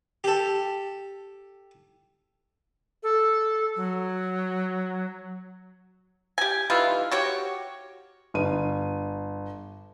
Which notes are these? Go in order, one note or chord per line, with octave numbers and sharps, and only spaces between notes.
G4 A4
A4
F#3
G4 G#5
E3 G3 D#4 F4
F#4 G4 C#5
G1 D#7